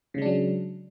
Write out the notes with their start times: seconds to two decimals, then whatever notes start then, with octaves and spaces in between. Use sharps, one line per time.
0.14 C#3
0.18 G#3
0.22 D4
0.26 F#3